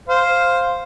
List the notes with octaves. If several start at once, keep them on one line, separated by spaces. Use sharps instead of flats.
C5 F5